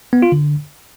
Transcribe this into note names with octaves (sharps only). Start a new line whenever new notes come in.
B3
F4
D3